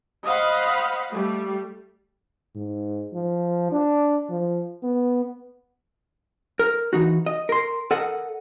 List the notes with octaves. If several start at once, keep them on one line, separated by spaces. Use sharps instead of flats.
C5 D#5 F5 F#5 B5
G3 A3
G#2
F3
D4
F3
B3
A#4
E3 D#4 F#4
D#5
A#4 C6
A4 A#4 D#5 F#5